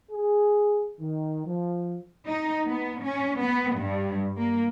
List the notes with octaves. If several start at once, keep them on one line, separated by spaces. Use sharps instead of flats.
G#4
D#3
F3
D#4
B3
C#4
B3
G2
A#3